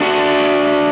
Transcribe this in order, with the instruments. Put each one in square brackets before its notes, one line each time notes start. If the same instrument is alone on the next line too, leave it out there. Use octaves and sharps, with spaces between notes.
[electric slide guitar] D4 F#4